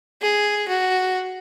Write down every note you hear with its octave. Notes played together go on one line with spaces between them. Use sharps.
G#4
F#4